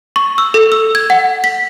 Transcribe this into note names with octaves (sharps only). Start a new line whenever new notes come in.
C#6
E6
A4
E6
G#6
F#5
B6